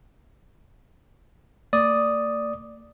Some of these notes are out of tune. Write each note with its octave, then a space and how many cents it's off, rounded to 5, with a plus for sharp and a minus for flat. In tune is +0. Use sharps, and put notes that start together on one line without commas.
A#3 -45 D5 +0 D#6 +0